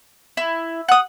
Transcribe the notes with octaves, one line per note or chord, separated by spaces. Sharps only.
E4
F#5 D#6